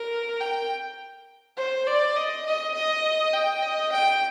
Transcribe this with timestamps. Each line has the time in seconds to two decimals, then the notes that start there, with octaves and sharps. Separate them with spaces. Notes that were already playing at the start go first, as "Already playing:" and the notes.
Already playing: A#4
0.40 G5
1.57 C5
1.87 D5
2.16 D#5
2.46 D#5
2.74 D#5
3.33 G5
3.63 D#5
3.91 G5